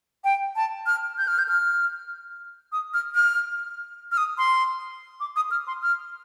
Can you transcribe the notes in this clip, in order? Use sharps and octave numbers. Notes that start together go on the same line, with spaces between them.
G5
A5
F6
G6
F6
G6
F6
D#6
F6
F6
F6
D#6
C6
D6
D#6
F6
C6
F6